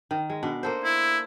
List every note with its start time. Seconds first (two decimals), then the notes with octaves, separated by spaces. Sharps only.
0.11 D#3
0.30 G#3
0.43 B2 D4
0.63 A#3 A4 C5
0.84 E4